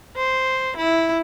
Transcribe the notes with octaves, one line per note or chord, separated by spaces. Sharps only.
C5
E4